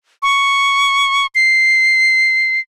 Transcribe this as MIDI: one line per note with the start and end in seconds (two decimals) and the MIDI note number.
0.22 1.27 85
1.35 2.60 96